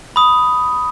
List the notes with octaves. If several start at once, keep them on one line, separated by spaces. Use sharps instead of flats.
B5 D#6